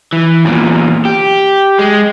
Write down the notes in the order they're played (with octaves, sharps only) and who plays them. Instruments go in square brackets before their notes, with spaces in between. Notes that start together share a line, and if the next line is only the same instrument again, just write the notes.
[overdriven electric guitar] E3
E2 A#2
G4
G#3